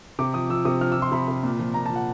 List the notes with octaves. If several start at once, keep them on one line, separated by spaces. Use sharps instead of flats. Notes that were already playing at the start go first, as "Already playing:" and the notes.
C3 D6
F3 D#6
F3 E6
C3 D#6
F3 F6
E6
F3
C6
C3 B5
C3
A#2
F3
A#2 A#5
A5
F3
F#5